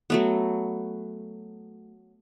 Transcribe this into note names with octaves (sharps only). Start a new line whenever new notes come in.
F#3 A3 B3